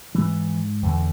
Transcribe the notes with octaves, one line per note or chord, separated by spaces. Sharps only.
G#2 E3
E2 D3